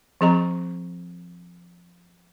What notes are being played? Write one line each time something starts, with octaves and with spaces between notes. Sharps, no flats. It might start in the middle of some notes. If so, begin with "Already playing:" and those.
F3 C4 G#4 D#5 A#5 C#6